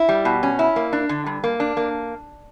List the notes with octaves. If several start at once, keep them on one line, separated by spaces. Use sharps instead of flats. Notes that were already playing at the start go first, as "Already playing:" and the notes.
Already playing: E4
G3
B2
C#4
E4
A#3
D4
D3
G2
A#3
D4
A#3